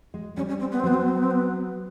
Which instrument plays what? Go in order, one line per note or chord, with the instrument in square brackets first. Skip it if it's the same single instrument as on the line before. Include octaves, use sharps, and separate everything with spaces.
[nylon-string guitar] G#3
[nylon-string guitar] G3 [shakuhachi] C#4
[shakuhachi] C#4
C4
B3
C4
[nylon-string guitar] F#3 [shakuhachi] B3
[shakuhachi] C4
B3
C4
B3
C4
B3